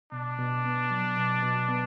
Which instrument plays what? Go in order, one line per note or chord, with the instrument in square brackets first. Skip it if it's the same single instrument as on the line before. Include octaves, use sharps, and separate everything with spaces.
[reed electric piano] B2 [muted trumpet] D4
[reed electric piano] B2
B3
F#3
B2
B2
B3